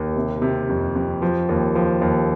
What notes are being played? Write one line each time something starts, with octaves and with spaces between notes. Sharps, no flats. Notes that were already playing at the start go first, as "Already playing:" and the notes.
Already playing: D#2
C3
C3
F2
F2
F3
D#2
F3
D#2